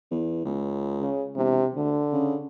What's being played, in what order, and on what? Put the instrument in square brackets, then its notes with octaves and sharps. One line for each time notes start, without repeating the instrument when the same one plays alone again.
[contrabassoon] E2
C#2
[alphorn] C#3
[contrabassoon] E1 [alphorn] C3
[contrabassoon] D2 [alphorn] D3
[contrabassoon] C#3